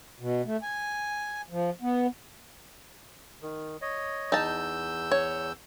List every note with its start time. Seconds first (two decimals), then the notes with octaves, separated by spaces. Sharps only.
0.20 B2
0.46 A3
0.62 G#5
1.50 F3
1.82 B3
3.42 D#3
3.82 C#5 D#5
4.32 E2 D#4 A5 E6 G6
5.11 C#5